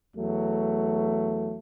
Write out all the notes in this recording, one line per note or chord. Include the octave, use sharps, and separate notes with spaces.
E2 F#3 A3